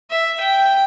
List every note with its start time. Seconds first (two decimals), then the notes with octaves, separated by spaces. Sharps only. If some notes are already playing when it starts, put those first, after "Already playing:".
0.10 E5
0.40 G5